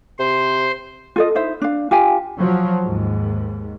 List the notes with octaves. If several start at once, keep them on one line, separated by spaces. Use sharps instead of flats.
C3 C5
F4 A4 D#5
D#4 E4 C5 E5
D4 F5
F4 G4 F5 G#5
F3 F#3
D#2 G#2